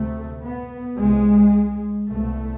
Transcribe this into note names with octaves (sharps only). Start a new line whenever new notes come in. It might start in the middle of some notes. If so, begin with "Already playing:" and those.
Already playing: D2 C3 A3
B3
C2 C3 G#3
C2 B2 A3